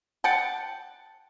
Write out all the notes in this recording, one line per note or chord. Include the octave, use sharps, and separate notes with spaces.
F#5 G5 A5